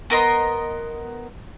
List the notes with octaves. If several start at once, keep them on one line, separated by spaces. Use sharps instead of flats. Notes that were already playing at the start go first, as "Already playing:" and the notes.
B3 A#4 D#5 C6